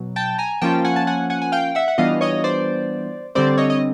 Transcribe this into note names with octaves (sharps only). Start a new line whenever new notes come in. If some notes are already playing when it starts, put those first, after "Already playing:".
Already playing: B2 F#3
G5 A5
G#5 A#5
F3 A#3 C#4 F4 G5 A5
F#5 G#5
A5
F#5 G#5
F#5 G#5
G#5
F5 G5
E5 F#5
F#5
E3 G3 B3 D4 F4 D#5 F5
C#5 D#5
C5 D5
D3 G3 C4 C5 D5
C#5 D#5
D#5